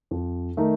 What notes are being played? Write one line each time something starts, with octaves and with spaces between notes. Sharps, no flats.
F2
D#3 A3 D#4 A#4